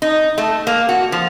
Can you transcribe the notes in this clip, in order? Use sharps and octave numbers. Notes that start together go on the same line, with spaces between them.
D#4
A3
A#3
F#4
F3